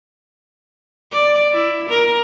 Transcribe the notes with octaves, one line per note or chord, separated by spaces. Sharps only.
D5
E4
A#4